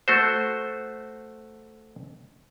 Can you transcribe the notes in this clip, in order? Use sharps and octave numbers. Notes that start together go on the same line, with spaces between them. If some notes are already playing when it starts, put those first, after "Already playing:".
A3 F#4 C5